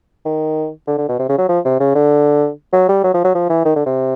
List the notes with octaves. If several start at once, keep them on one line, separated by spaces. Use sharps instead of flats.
D#3
D3
D3
B2
C3
C#3
F#3
F3
C3
C#3
D3
F#3
G3
F#3
F3
F#3
F3
E3
D#3
D3
C3